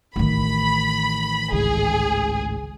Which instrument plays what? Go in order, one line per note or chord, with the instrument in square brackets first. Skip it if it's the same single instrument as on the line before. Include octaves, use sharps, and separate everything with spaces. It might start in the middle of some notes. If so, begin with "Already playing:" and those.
[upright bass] A1 D#3 [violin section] B5
[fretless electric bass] G#1 C#2 A2 [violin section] G#4